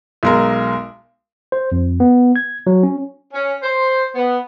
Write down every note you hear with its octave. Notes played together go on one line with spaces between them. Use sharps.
B1 G#3 A#4
C5
F2
B3
G#6
F#3
C#4
C#4
C5
B3